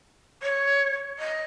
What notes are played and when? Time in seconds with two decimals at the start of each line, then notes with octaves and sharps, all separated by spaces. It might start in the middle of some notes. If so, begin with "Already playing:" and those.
0.42 C#5
1.19 D#5